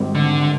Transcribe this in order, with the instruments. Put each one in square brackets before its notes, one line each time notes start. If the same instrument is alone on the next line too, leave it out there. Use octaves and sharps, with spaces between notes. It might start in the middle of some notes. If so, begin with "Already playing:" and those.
Already playing: [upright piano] G#1 G#2 D#3 G3 C4
[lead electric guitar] D3